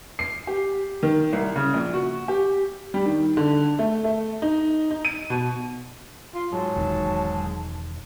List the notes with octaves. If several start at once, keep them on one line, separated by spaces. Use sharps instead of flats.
C7
G4
D#3
C2
C#3
A#1
F#4
G4
G3
D#3
D3
A3
A3
D#4
D#4
D#7
B2
F4
G#2 F#3 A5
E1 E2 D#3